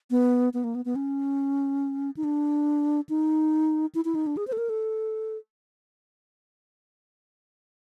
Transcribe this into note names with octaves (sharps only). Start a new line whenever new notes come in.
B3
B3
A#3
B3
B3
C#4
D#4
D4
D#4
E4
E4
D#4
D4
G#4
C5
A4
A#4
A4